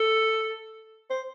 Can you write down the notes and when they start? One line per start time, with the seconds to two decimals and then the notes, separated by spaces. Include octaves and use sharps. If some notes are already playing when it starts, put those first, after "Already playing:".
Already playing: A4
1.10 C5